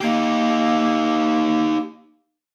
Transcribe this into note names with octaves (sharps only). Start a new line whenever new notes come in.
A#3 D#4 G4